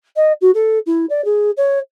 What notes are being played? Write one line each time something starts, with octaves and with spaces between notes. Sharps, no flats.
D#5
F#4
A4
E4
D5
G#4
C#5